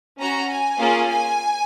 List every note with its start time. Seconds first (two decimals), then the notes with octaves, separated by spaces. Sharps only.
0.19 C#4 F#4 A#5
0.49 G#5
0.78 A#3 C#4 F4 G#4
1.09 G#5